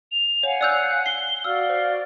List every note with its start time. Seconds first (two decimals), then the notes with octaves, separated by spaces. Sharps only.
0.12 F7
0.43 C#5 F5 F#5 G#5
0.61 D5 E6 F#6 G6
1.06 C7 G7
1.44 F#4 D5 F5 E6 F6
1.69 C5